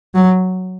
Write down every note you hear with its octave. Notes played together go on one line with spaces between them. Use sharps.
F#3